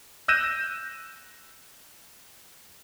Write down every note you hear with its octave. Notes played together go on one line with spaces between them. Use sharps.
E6 F#6 G6 A#6 D#7 E7